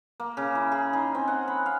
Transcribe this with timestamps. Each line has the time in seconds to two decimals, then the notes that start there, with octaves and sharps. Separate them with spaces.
0.20 A#3
0.37 C#3
0.55 E4
0.72 G#4
0.93 D#4
1.15 C4
1.28 F#5
1.48 B5
1.66 F5